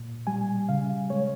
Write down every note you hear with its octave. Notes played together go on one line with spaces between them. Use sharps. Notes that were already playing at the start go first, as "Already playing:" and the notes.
Already playing: A#2
G3 G#5
C#3 F5
G#3 C#5